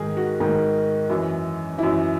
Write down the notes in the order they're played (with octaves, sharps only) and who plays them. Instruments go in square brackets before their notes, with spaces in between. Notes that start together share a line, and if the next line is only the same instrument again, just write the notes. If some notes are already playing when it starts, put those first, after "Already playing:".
Already playing: [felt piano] G#2 D#3 G#4 A#4
F#4
G#2 D#3
F#2 E3
F#2 E3 E4